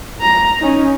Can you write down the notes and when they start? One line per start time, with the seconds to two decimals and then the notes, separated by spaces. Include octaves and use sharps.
0.21 A#5
0.60 C#4 D#4